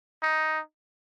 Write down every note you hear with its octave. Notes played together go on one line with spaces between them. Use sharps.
D#4